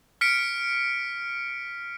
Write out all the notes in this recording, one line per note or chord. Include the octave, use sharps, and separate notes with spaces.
F6 B6 C#7 D7